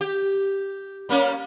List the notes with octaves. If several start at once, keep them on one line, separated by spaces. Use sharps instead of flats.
G4
G3 A#3 C#4